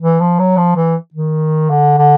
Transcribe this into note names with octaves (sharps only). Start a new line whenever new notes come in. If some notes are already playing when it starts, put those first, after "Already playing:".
E3
F3
F#3
F3
E3
D#3
D3
D3